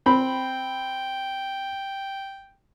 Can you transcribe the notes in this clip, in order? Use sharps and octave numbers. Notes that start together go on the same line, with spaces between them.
C4 G5 B5